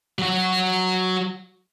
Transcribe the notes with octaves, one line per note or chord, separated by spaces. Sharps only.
F#3 F#4